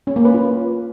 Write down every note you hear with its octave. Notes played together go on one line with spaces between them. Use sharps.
C#4
A#3
B4
F4